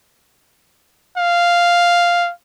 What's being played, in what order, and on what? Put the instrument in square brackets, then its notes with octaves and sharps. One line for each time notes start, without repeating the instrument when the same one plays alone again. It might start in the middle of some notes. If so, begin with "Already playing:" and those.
[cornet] F5